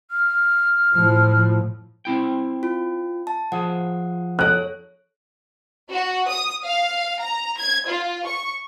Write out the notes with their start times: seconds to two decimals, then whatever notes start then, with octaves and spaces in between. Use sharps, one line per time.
0.11 F6
0.94 A2 F3
2.05 C4 E4 G5
2.63 F4
3.27 A5
3.52 F3 G#4 F#5
4.39 A4 C#5 F#6
5.90 F#4
6.28 D#6
6.64 F5
7.20 A#5
7.57 G#6
7.89 F4
8.26 C#6